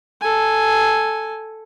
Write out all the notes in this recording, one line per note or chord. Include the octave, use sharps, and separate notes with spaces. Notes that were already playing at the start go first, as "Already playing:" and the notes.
A4 G#5